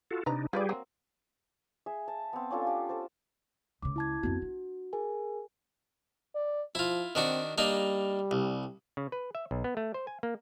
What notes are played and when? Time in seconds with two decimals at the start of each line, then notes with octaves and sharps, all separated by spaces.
0.11 F4 F#4 A4
0.26 C3 D4 D#4 B4 A#5
0.53 G3 F4 G4 G#4 B4 D5
0.69 F#3 A#3 C4
1.86 G#4 E5
2.08 A5
2.33 B3 C4
2.50 C#4 D4 F4 A4
2.67 G4
2.89 A4 C5
3.82 C#2 C#3 D6
3.96 E4 A5 G#6
4.23 F2 B3 F#4
4.42 D4
4.93 G#4 A#4 G#5
6.35 D5
6.75 F3 E4 F4
7.15 D#3 C4 D4 F#4
7.58 G3 A#3 D4 D#4
8.31 C2
8.97 C#3
9.12 B4
9.35 E5
9.51 B1
9.64 B3
9.77 A3
9.94 C5
10.07 G#5
10.23 A#3